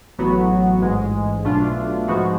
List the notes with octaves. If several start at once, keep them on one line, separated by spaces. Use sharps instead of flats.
A1 A2 F#3 B3 F#4
A1 G#2 G#3
B1 B2 A3 D4 F4
G#2 F3 G#3 B3 F#4